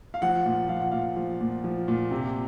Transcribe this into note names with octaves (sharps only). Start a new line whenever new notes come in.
F5
F3 F#5
A#2
F3 F5
F#5
A#2 F5
F3
A#2
F3
A#2
C3